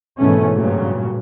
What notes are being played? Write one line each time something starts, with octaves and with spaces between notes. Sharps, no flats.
G#2 B2 E3 A3 B3 C#4
G2 A#2 C#3 F#3